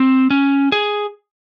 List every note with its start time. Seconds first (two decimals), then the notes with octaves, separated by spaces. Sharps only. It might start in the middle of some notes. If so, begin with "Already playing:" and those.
Already playing: C4
0.30 C#4
0.72 G#4